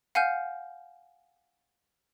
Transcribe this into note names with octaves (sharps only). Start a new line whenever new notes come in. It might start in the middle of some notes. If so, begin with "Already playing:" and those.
F5 F#5 G#5 F6 G6